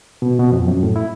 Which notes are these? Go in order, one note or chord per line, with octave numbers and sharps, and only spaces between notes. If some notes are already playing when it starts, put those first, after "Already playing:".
B2
B2
F2
F#2
A2
E4